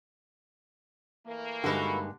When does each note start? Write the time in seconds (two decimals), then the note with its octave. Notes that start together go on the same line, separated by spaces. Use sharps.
1.27 E3 A3 A#3
1.64 G2 D3 G3 G#3 D#4 F#4 A4 B4